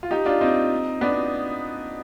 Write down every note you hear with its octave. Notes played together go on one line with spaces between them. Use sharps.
F4
D#4 G4
D4 F4
C4 D#4
B3 D4